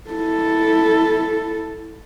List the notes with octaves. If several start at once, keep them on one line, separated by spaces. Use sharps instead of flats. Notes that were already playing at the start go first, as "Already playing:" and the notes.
E4 A4